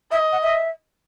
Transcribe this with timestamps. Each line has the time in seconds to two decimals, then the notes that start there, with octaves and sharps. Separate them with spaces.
0.12 D#5 E5
0.32 F#5
0.42 E5